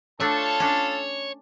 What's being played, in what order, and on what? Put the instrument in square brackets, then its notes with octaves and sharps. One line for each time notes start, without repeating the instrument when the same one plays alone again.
[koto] A3 D4 D5 [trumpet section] F4 A4 A5 [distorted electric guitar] C#5
[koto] C#4 D4